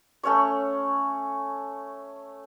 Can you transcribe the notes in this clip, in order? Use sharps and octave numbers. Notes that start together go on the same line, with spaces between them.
A3 C#4 C#5 C#6